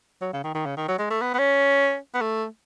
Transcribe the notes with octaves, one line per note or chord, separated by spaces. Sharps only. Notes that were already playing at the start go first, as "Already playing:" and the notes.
F#3
C#3
D#3
D#3
C#3
D#3
F#3
G#3
A3
B3
B3
C#4
B3
A3